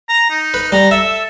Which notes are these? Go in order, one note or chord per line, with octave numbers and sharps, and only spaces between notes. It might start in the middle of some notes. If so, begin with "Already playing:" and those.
A#5
D#4
B4
G3 A#5
A4 E5